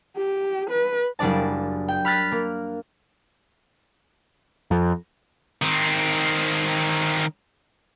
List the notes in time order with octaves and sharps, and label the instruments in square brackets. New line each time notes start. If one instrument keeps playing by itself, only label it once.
[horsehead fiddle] G4
B4
[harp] F#1 G3 D4 D5 A5
G5
B5 F6 F#6 A6 B6
A#3
[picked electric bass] F2
[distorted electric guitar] D#3 C4